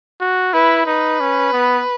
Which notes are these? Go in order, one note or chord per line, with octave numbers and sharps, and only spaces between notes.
F#4
E4 B4
D#4 B4
C#4
B3